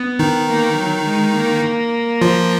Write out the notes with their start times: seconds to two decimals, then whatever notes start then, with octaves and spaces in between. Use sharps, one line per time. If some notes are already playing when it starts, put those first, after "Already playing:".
Already playing: B3
0.19 D#3 D#4
0.48 A#3
0.78 F#3
1.06 G#3
1.34 A#3
2.21 F3 F4